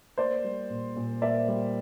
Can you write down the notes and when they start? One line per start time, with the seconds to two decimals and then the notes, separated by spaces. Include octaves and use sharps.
0.18 A#3 C5 D5
0.44 G3
0.70 A#2
0.96 A#2
1.22 A#3 D5 E5
1.48 G3